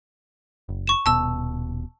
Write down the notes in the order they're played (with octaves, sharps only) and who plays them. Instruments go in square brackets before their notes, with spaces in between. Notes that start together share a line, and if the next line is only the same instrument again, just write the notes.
[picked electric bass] F#1
[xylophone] C#6 E7
[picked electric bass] D#1 B2 [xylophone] A5 E6